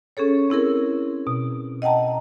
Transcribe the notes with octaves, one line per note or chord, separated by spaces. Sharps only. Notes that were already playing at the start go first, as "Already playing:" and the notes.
C#4 G#4 A4 C#5
C4 E4 G#4 A#4
B2
D#5 F#5 G5 A5 A#5